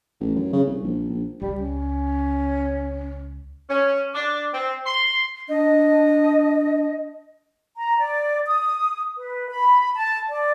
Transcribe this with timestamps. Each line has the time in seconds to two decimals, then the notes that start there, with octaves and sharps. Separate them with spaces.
0.20 A1
0.36 F#2
0.53 C#3
0.67 C2
0.83 A#1
1.10 A#1
1.42 C#2 G3
1.61 C#4
3.69 C#4
4.14 D4
4.53 C4
4.86 C6
5.49 D4 D#5
7.77 A#5
7.99 D5
8.47 D#6
9.18 B4
9.50 B5
9.96 A5
10.30 D5